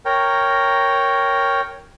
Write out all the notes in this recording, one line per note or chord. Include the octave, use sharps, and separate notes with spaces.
A#4 C#5 G5 A#5